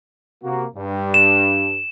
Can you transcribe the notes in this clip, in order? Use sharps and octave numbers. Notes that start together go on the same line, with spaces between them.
C3 A#3 F#4
G2
E7